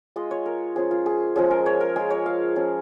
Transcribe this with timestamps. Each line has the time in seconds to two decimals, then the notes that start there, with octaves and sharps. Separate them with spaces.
0.16 G#3 F4 D#5
0.31 C#5
0.46 A#4
0.76 F3 C#4 F4 G#4
0.91 F4
1.06 G#4
1.36 F3 G#3 C#4 G#4
1.51 A#4
1.66 C#5
1.81 A#4
1.96 G#3 F4 G#4
2.10 C#5
2.26 F5
2.56 F3 C#4 F4